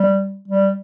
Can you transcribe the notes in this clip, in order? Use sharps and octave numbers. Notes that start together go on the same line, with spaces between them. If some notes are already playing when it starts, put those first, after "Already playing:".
Already playing: G3
G3